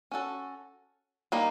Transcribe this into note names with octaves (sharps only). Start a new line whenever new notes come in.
C#4 F#4 A4
G3 A#3 D#4